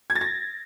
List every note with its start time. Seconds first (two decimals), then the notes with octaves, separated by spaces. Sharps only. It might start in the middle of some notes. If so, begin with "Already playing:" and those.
0.10 G#6
0.15 A6
0.21 A#6